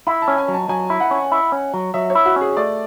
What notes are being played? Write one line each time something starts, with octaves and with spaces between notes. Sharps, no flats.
E4 B5
A5
C#4
G#5
F#3
A5
F#3 G#5
E4
F#5
C#4
E4
C#4
F#3
F#3 E5
C#5
E4
F#4
C#4
G#4
A3 D5